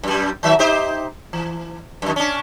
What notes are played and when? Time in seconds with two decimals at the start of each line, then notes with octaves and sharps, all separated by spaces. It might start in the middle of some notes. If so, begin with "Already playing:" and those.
0.03 F#2 G3
0.43 D#3 F#3 E5
0.59 D#4 G4 C5
1.33 E3
2.02 F#2 D#3
2.16 C#4 D4